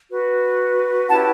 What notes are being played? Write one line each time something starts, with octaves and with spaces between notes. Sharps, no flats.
F#4 B4
C#4 E4 G4 B4 F#5 A5